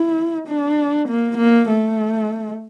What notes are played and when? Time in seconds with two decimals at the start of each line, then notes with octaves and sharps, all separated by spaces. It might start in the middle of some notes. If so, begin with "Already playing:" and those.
Already playing: E4
0.48 D4
1.09 A#3
1.38 A#3
1.69 A3